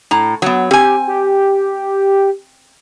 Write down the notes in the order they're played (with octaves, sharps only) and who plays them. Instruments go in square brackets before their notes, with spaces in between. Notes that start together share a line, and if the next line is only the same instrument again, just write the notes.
[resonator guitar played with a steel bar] A2 A#5
F#3 B3
[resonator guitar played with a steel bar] C4 G#5 [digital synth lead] G4
[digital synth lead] G4